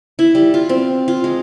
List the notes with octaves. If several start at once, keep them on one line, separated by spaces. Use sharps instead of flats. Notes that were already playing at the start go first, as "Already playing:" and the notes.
E4
G3
F4
C4
F4
G#3